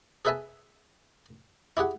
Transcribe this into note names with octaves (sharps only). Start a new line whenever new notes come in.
G#4 A4 B4 E5 G#5 A5
E4 G4 G#4 F#5